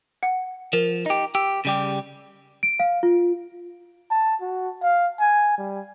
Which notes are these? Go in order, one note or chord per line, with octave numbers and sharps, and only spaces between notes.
F#5
F3 A#4
D#4 G4
G4 E6
C#3 G3 G4
D7
F5
F4
A5
F#4
F5
G#5
G3